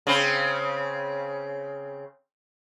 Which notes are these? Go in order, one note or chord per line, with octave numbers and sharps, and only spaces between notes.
C#3 C4